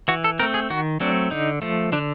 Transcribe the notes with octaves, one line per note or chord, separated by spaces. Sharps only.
E3 F#4
A4
A3 C4 A#4
G#4
D#3 F#4
F#3 A3 C4 D4
D3 D#4
F3 A3
D3 D4